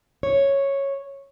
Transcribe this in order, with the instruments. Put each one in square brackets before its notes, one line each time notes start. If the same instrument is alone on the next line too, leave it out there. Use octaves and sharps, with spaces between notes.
[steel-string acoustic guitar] C#5